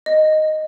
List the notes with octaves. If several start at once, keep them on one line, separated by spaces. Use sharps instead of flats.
D#5